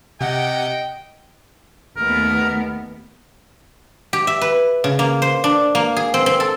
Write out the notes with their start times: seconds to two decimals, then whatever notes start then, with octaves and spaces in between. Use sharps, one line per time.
0.21 C3 D#5 F#5 G5
1.97 D#2 A3 B3 A#4
4.13 G4
4.27 E5
4.41 B4
4.84 C#3
4.99 A#3
5.22 C5
5.44 D4
5.75 A#3
5.97 G#4
6.14 C4
6.26 C4
6.40 A4